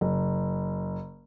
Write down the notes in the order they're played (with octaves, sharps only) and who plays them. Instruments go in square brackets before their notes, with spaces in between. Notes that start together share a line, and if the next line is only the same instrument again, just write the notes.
[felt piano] F#1